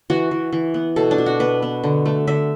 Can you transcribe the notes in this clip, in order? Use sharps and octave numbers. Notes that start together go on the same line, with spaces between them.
E3 F#4
E3
E3
B3
B2 A4
D4
B2
F#4
B3 B4
B3
D3
A3
D3 E5